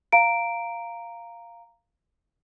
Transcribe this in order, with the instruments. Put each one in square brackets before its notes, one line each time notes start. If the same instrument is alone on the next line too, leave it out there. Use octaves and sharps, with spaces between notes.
[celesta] F5 A#5 D7